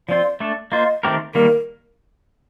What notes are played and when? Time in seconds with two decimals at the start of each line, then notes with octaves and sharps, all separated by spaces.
0.09 F3 C4 F4 C5 D5
0.40 A3 D4 A4
0.72 A#3 F4 C5 D#5
1.03 D#3 A3 C4 G4 A#4
1.35 D#3 G3 A#3 A#4